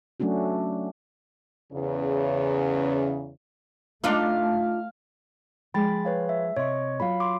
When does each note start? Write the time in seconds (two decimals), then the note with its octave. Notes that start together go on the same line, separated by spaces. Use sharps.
0.20 F#3 A3 C#4 D4 F#4
1.72 E2 C#3
4.04 A3 D4 D#4 F4 F5
5.74 F3 G#3 G5 B5 A6
6.05 B4 C#5 F5
6.29 E5
6.56 C3 C#5 D#5 C#6
7.00 F#3 F4 C#5 F5 B5
7.20 C6 D6